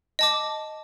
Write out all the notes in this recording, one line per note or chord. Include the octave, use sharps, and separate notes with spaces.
D#5 A5 D6